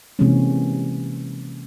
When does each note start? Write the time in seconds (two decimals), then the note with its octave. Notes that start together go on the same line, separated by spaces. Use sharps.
0.19 C3 E3 G#3 A#3 C4 C#4